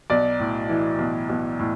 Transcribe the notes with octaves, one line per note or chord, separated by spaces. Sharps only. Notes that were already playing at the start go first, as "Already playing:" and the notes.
B1 D5
A2
E3
B1
B1
A2